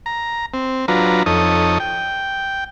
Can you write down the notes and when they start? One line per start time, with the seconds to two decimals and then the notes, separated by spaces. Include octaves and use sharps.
0.06 A#5
0.54 C4
0.88 F#3 D4 F4 B4 A#5
1.26 F2 D#4 A4 C#5 D#6
1.80 G5